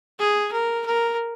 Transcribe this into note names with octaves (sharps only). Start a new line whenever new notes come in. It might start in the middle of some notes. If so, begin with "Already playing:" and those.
G#4
A#4
A#4